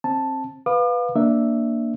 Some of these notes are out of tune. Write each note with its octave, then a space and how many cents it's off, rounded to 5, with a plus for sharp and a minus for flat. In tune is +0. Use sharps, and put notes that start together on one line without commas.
C4 +25 A5 +0
B4 +0 F5 +15 D6 +45
A#3 +0 D4 +0 E5 +0